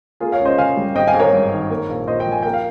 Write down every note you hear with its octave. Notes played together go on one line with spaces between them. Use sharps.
A#3 F4 G#4
C#5 F5
C#2
C5 D#5
C#3 F5 G#5
G3
G#1 D#5 G5
F5 G#5
G#1
A#4 C#5
G2
D#3
A#3
A#1
A#2 C5 D#5
D#5 G5
F3
G#5
A#3 G5
F5